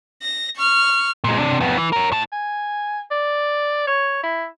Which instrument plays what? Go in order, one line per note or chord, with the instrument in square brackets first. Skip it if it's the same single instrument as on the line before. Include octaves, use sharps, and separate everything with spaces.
[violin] A#6
C#6 F6
[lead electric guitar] A#2 G#3
C3 D4
F2 B3
E3
A#4 C#5
A2 A5
[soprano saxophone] G#5
D5
C#5
E4